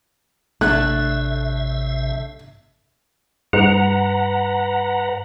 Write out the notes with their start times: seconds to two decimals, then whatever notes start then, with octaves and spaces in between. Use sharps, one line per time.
0.61 A1 C3 A3 D4 E5 F#6
3.53 G2 B4 F#5 A#5